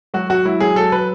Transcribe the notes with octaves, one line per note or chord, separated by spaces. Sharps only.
F#3 F#4
F#3 F#4
F#3 E4
F#3 G#4
F#3 A4
F#3 B4